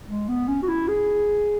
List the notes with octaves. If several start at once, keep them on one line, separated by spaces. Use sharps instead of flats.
G#3
B3
C#4
F#4
E4
G#4